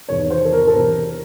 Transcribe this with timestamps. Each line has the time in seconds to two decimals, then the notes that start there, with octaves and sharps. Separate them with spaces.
0.08 E2 C3 D#3 C#5
0.30 C5
0.45 A4
0.53 A#4
0.67 A4
0.74 C3 E3 A#4